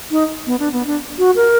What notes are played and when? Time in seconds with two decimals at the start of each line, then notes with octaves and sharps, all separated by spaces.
0.11 D#4
0.46 B3
0.59 D4
0.73 B3
0.87 D4
1.18 F#4
1.36 A#4